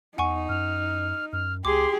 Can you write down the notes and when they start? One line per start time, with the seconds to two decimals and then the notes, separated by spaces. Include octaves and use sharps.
0.18 E2 D#4 F#5 G#5 C#6
0.49 F#2 F6
1.33 F#2 F6
1.65 C#2 G4 G#4 C6 D6